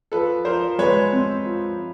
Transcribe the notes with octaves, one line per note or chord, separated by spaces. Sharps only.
F3 A4 B4
F3 A#4 C5
G#3 B4 C#5
C4
F3